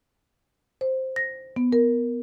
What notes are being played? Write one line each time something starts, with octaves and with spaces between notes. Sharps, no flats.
C5
A#6
B3
A#4